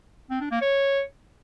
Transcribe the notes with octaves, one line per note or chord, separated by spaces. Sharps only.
C4
D4
A#3
C#5